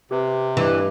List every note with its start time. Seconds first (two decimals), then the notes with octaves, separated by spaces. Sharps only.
0.11 C3 G4 B4
0.57 G2 E3 A3 D#5 D6